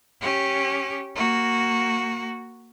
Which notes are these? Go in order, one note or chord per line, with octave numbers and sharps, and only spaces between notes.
C#4 G4
A#3 F#4